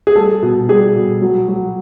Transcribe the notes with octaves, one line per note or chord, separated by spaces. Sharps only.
G#4
G3 A4
B2
G3 G#4
B2
F#3
F#3